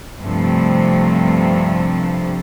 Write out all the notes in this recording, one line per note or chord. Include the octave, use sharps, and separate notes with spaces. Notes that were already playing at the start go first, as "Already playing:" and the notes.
G2 C3 F3 A3